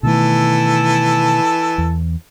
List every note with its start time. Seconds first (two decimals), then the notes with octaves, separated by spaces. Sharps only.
0.03 B2 D#3 E3 A3 A4
1.78 E2